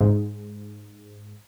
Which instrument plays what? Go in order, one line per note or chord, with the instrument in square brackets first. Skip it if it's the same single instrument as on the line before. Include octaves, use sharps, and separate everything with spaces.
[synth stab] G#2